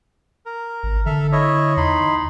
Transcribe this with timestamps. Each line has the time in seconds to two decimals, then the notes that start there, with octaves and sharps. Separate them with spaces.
0.46 A#4
0.83 G#1
1.06 D3 A4 E5 F6
1.32 E4 C#5 D#5
1.77 E2 D#4 B5 C6